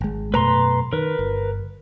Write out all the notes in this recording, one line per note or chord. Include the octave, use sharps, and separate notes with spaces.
G#1 G#3
F#2 B2 A3 B4 A#5 C6
D#3 A#4 B4
G1